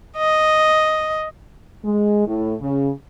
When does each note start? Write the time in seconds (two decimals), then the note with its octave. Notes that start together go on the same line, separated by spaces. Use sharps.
0.18 D#5
1.85 G#3
2.27 A2
2.61 C#3